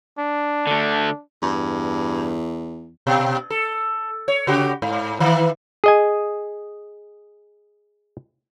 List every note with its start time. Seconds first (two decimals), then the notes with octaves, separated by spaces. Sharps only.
0.19 D4
0.67 D3 A3
1.42 E2 G2
3.07 B2
3.50 A4
4.28 C#5
4.47 C#3 F#4 G4
4.82 G#2
5.20 D#3 E3
5.84 G#4 D#5 G#5